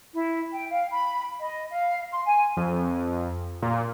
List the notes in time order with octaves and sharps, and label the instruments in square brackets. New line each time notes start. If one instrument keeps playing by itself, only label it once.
[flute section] E4
G5
F5
B5
D#5
F5
C6
G#5
[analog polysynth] F2
A#2